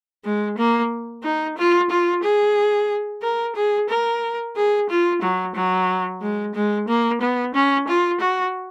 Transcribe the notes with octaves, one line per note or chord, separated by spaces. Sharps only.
G#3
A#3
D#4
F4
F4
G#4
A#4
G#4
A#4
G#4
F4
F#3
F#3
G#3
G#3
A#3
B3
C#4
F4
F#4